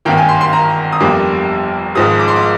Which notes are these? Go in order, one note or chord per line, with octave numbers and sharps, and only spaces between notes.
G#1 G2 D#3 A#3 G5
G#5
C6
C6
A#5
D#6
G1 F2 D3 G3 A#3 D6
G#1 G#2 F3 G#3 D#6
D6
C6
D6